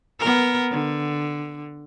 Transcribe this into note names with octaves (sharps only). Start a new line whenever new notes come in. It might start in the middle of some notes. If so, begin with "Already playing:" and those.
B3 A#4
D3